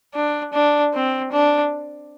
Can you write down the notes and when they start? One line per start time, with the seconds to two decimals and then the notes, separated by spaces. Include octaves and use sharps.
0.15 D4
0.53 D4
0.94 C4
1.32 D4